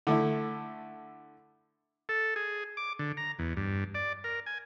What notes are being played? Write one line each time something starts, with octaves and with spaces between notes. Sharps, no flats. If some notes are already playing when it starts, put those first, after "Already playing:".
D3 A3 E4
A4
G#4
D6
D3
A#5
E2
G2
D5
A#4
G#5